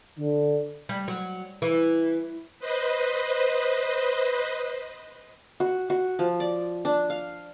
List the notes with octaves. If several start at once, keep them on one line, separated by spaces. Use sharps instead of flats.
D3
G3
F#3
E3
B4 C5 D#5
F#4
F#4
F3
D5
D4
F5